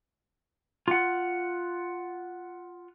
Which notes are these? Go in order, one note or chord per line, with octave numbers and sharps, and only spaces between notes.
F4 F#5